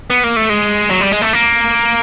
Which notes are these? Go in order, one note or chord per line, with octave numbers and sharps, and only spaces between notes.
B3
A#3
A3
G#3
F#3
G3
G#3
A3
A#3